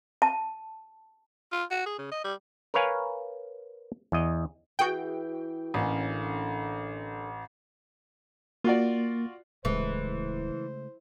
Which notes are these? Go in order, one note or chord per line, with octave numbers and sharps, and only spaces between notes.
A5
F4
F#4
G#4
C#3
D#5
G3
A#4 B4 C#5 F5 G#5
E2 D#5
E3 F#4 G#4 G5
A1 D3 A#3 C#4
A#3 F4 F#4 D5
D1 C#3 E3 G#3 A3 C5